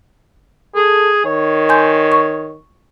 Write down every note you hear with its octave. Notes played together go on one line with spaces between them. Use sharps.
G#4 A4
D#3 C#5
G#5 C6 G6
C#6